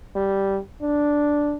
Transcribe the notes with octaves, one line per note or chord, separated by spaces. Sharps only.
G3
D4